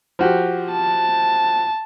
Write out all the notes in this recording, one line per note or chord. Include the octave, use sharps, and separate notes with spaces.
F3 F#4 G4
A5